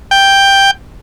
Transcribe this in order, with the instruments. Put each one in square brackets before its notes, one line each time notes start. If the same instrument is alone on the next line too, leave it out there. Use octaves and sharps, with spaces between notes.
[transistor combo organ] G5